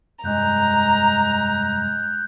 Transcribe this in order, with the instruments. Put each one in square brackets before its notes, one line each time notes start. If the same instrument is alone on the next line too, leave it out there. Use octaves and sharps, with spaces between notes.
[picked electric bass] F1 G2 G3 [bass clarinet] G#3 [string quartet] A#5 [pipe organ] F#6 G6